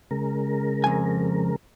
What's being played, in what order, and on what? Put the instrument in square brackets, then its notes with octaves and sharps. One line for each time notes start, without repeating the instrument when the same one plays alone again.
[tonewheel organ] C#3 G#3 A#4
[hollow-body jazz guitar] F2 G#5